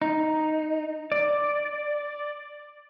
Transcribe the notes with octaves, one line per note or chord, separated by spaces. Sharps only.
D#4
D5